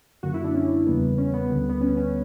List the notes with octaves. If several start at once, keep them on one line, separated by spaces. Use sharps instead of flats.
F#2 D3 A#3 F#4
E4
D4
C#4
E2 C#3 G3 A#3 B3
C#4
B3
D2 D3 G3
B3
C#4
C#4